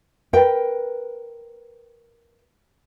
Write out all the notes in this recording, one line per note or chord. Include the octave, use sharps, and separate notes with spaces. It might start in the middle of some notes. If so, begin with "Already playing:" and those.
A#4 B4 G5